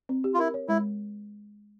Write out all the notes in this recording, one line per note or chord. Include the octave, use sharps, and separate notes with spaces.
C4
G4
F4
E4 A#4
C#5
G#3 E4